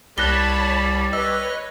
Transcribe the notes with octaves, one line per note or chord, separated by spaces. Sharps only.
C2 G3 C#5 A5 B5 F#6 A#6 G7
B4 C#5 D#5 E6